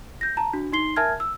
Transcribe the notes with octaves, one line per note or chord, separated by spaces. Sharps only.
G6 A#6
A5 A#5
D4 F#4
D#4 C6 C7 G7
A#4 E5 G#5 A5 F6 G#6
E6